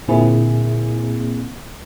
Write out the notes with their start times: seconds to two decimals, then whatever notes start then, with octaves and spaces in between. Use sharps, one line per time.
0.08 A#2 D3 A#3 C4 E4 G#4